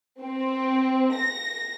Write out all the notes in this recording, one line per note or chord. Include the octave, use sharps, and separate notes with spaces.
C4
A#6